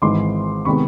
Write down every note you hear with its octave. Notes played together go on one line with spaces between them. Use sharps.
G#1 G#2 E3 G#3 C6 D6
C3 D#3 G#3 B3 B5 C#6